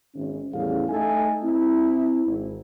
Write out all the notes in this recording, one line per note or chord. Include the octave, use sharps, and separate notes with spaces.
G#1 C#4
E2 A2 G3 C#4 G#4 F5
A3 D#4 A4 E5 G#5
C4 E4
G#1